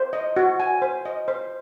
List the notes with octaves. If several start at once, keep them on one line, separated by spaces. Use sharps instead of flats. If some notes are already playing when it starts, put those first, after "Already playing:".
Already playing: C5
D#5
F#4
G#5
C5
D#5
C5